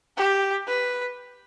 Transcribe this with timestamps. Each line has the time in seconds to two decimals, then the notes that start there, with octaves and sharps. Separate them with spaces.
0.17 G4
0.68 B4